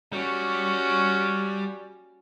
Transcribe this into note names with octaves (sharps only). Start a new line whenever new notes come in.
G3 C#4 F#4